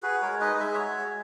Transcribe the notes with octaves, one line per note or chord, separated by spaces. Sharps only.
F#4 G#4 B4
G#3 A#4 C#5
D#4 B4 D#5
G#3 E5
D#5
F#4 C#5 E5
G#3